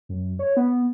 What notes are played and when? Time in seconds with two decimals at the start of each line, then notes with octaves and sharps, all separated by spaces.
0.09 F#2
0.39 C#5
0.57 B3